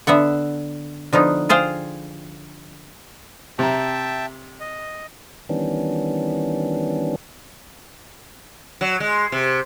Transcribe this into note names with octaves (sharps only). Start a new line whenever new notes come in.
D3 B3 E5 F#5
D3 F3 B3 D#4
F4 G#4 C5 F5 G5
C3 E5 G5 A5 A#5
D#5
D#3 E3 G3 B3 C#4 D4
F#3
G#3
C3